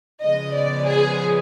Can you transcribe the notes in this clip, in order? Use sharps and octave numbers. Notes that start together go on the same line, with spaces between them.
C#3 F3 G#3 B3 D#5
D5
G#4